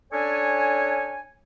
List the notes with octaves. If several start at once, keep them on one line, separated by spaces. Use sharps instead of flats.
C#4 D4 A4 C#5 G#5